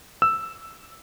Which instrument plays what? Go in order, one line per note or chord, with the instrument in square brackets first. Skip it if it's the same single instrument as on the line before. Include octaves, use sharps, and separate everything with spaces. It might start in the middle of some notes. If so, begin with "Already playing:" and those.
[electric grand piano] E6